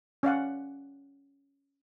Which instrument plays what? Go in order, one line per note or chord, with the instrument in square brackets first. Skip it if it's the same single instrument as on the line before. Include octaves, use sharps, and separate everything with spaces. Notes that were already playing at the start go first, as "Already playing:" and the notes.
[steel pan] C#4 D5 F5 F#5